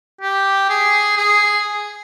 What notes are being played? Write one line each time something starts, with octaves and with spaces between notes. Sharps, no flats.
G4
G#4
G#4